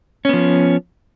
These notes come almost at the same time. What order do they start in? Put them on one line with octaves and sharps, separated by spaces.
C#4 B3 F3